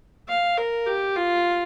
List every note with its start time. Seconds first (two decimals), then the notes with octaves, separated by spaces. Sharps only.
0.28 F5
0.58 A#4
0.87 G4
1.16 F4